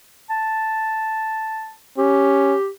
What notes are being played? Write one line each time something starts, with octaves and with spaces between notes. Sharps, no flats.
A5
C#4 G4